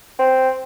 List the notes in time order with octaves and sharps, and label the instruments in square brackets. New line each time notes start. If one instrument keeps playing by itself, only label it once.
[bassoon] C4